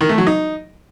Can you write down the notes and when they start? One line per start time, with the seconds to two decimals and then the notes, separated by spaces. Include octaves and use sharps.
0.01 D#3
0.09 A3
0.18 F#3
0.27 D#4